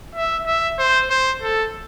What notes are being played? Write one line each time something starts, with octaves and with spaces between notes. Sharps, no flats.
E5
E5
C5
C5
A4